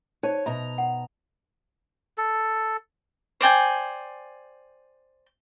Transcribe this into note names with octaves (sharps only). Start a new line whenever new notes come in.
D#4 C5 C#5 A5
B2 E5 A#5
F#5
A4
C5 D5 G5 G#5